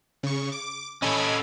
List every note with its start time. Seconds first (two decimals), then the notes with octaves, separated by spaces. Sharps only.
0.23 C#3 C#6
0.52 D6
1.02 C#4 A4 D#5 B5 G#6